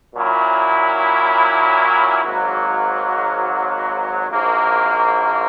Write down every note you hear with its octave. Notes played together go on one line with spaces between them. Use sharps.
A#2 F#3 C#4 E4
G#1 G#2 F#3 A#3
A#1 G#2 F#3 A#3